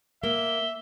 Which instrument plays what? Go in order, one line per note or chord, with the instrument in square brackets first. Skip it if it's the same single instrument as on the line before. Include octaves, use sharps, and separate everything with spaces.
[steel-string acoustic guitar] A#3 [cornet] E5 [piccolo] G7